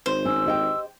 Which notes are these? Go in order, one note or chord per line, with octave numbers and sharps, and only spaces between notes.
G#1 C5
C#4 E6
G4 D#5 G5